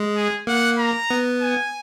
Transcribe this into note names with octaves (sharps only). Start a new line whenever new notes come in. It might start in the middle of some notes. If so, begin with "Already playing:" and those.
Already playing: G#3
G#4
A#3 F#5
A#5
B3
G#5